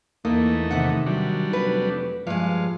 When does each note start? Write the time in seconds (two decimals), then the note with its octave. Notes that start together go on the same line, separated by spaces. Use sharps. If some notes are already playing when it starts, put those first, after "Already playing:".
0.25 E2 E3 A3 A#3 D#4
0.71 C3 D#3 F#5
1.07 F#3 G3 D4
1.53 F1 B4
2.27 G2 F3 G#3 F5